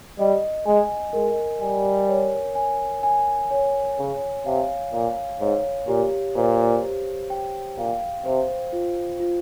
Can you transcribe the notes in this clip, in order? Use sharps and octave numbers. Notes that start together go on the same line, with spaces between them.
G3 D#5
G#3 G#5
G#3 A#4
G3 G#5
C#5
G#5
G#5
C#5
C#3 C#5
C3 F5
A#2 F5
G#2 C#5
A#2 G4
A#2 C5
G4
G5
A#2 F5
C3 C5
F4
F4